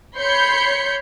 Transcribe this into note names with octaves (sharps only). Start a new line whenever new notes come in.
C#5 B5 C6 G6 C#7